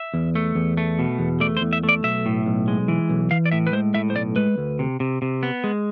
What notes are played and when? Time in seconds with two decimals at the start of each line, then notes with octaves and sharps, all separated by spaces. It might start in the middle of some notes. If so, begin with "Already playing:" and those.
Already playing: E5
0.14 E2
0.35 A3
0.55 E2
0.77 A3
0.99 B2
1.19 E2
1.40 A3 D5
1.57 C5
1.61 E2
1.73 E5
1.83 A3
1.89 D5
2.04 B1 E5
2.26 A2
2.46 B1
2.68 G#3
2.88 E3
3.09 B1
3.31 E3 F5
3.46 D5
3.51 A2 E5
3.67 B4
3.73 G#3 C5
3.94 A2 E5
4.10 C5
4.15 B1 D5
4.36 G#3 B4
4.58 D2
4.79 C3
5.00 C3
5.22 C3
5.43 B3
5.64 G#3